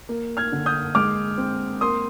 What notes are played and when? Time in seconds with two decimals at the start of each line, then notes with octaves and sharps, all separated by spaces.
0.09 A#3
0.37 F6 G#6
0.52 D3
0.66 D#6 G6
0.95 G#3 D6 F6
1.38 C4
1.81 A#3 C6 D#6